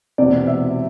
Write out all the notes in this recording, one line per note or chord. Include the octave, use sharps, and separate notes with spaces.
E1 E2 C3 D5
E5